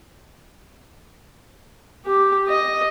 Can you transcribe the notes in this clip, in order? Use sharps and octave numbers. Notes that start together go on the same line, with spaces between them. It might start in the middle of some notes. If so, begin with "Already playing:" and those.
G4
D#5